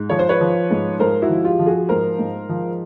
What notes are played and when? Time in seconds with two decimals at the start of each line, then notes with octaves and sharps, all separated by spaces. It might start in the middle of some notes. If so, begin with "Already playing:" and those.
Already playing: G#2
0.10 F3 C#5
0.19 C5
0.29 B4 C#5
0.41 F3
0.70 G#2
1.00 G#2 A#4 C5
1.22 E4 F#4
1.29 F3
1.44 F4 G4
1.59 F3
1.66 F#4 G#4
1.89 G#2 A#4 C5
2.18 G#2
2.49 F3